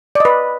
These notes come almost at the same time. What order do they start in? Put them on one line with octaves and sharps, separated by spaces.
D5 D#5 B4